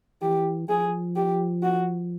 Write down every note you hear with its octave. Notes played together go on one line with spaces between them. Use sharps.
E3 G4
F3 G#4
G4
F#4